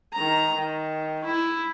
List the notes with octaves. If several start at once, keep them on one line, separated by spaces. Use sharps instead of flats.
D#3 A#5
D#3
E4